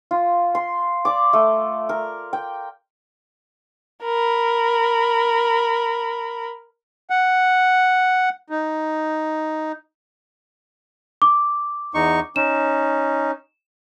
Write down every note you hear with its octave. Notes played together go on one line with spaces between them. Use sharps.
F4
C6
D5 D6
A3
A#4
G5
A#4 B5
F#5
D#4
D6
E2 D#4 C#6
C#4 D#4 E7